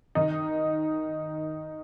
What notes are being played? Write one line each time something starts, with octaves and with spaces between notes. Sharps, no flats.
D#3 D#4